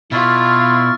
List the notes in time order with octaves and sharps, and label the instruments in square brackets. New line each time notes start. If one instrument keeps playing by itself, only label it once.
[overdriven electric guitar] B2 [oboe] E4 [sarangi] F4 [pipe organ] C#6 F6 A6